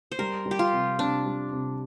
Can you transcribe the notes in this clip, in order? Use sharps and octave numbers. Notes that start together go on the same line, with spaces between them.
C5
G3 A#4
G3
G4
F4
C3
C3 D4
G3
C3